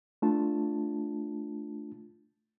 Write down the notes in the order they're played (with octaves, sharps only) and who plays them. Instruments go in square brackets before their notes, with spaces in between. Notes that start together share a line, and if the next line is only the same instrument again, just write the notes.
[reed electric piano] A3 D4 F4 A5